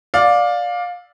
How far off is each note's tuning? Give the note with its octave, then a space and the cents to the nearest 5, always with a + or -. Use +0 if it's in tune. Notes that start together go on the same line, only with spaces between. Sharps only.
D5 +0 F5 +20